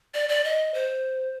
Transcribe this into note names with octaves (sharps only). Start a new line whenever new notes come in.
D5
D5
D#5
C5